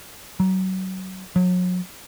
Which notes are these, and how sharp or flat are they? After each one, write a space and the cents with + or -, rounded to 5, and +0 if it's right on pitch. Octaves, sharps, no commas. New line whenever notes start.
F#3 +25
F#3 -35